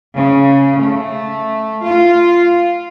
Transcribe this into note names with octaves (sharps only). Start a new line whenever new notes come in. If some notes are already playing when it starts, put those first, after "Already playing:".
C#3
A3
F4